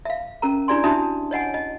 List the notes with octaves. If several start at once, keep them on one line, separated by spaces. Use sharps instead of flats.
E5 F5
C#4 A#4 A#5
D4 E4 G4 D5 G#5 C6
D4 D#4 F#4 E5 A5 D#6
C#5 D#5 F#5 G#5
D#5